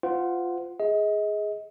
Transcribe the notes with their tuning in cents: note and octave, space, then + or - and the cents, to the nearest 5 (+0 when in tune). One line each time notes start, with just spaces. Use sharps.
F4 +0 C5 -35 F#5 +0
G#4 +0 D#5 +30